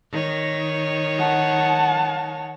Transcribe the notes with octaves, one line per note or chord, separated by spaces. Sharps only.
D#3 C#5
F#5 A5